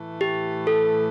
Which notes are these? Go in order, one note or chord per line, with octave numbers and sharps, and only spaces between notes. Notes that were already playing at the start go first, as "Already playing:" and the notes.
Already playing: A2 E3 A3
G4
A4